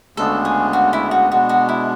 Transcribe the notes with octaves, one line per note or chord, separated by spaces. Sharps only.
D2 C#3 G#3 B3 D4 A4
G#4
F#4
E4
F#4
B2 G#3 B3 D4 F#4
F#4
E4